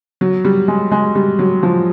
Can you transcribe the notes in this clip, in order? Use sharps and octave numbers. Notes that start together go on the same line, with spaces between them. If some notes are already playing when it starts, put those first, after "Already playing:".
F#3
G3
G#3
G#3
G3
F#3
F3